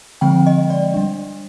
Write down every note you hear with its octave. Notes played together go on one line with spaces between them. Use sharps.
D3 F3 G#3 C4 G5
D#5
D5
G3 D4